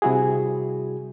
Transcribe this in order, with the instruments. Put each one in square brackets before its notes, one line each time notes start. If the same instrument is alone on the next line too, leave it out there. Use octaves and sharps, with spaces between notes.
[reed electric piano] C3 G3 E4 F#4 G#4